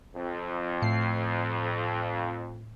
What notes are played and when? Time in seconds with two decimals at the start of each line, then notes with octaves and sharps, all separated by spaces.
0.15 F2
0.82 A2 C7